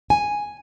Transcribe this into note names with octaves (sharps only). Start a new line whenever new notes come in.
G#5